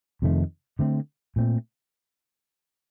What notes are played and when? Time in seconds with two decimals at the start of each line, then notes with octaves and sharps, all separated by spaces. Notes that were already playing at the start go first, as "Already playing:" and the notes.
0.22 F2 C3 D#3 A3
0.79 D3 A3 C4
1.36 A#2 A3 C4